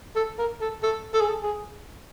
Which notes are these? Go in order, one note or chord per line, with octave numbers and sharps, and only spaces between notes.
A4
A#4
A4
A4
A4
G#4
A4
G#4